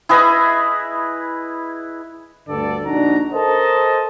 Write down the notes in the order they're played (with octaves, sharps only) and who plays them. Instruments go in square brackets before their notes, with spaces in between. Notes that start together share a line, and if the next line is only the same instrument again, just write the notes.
[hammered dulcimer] E4 G#4 B4 D#5
[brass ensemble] D2 G2 D3 A4 D5
A#1 D4 D#4 F#4 A#5
A4 A#4 C5 D#5 A5